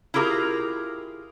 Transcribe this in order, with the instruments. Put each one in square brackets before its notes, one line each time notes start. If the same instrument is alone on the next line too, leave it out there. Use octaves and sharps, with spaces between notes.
[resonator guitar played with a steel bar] E4 F4 G4 G#4 A#4 F5